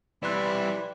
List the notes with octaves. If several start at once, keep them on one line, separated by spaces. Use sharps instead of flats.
E3 G3 E4 D5 C6 F#6